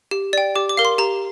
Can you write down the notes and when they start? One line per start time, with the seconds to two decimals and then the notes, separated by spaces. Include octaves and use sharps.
0.11 G4
0.33 D5 G5
0.55 G4 D6
0.69 D6
0.77 A#4 F5
0.85 C6
0.98 G4 A#5